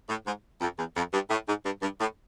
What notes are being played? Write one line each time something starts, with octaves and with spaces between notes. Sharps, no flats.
A2
G#2
F2
E2
F2
G2
A2
G#2
G2
G2
A2